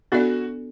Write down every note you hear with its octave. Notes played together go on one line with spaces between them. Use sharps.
B3 D4 F#4 A4 D5